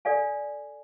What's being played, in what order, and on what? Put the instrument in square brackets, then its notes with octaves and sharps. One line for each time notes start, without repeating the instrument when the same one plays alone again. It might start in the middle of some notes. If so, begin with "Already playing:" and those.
[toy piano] A4 D5 F5 G#5